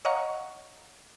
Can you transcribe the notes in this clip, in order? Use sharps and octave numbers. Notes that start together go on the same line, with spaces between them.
C#5 D#5 F5 F#5 A#5 C#6